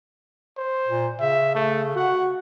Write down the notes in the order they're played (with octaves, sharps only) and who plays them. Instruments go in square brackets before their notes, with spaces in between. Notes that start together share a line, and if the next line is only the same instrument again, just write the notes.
[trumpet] C5
[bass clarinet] A#2
[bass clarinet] C#3 [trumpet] E5
[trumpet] A3
[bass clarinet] F#4 [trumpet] F#5